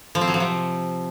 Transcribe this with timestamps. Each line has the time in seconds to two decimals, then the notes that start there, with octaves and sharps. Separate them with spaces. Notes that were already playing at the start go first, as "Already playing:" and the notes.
0.15 F3
0.21 C4
0.28 F#3
0.34 F3
0.40 C3